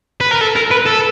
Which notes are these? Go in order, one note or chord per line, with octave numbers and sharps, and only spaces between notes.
B4
A#4
A4
A#4
B4
A4